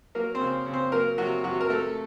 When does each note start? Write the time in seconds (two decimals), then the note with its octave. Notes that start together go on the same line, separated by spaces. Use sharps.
0.15 F#3 A#3 A#4
0.35 C4 C5
0.41 C#3
0.66 C#3
0.73 C4 C5
0.92 F#3 A#3 A#4
1.18 C3 F#3 F#4
1.44 C3 F#3 F#4
1.61 A#4
1.70 A3 A4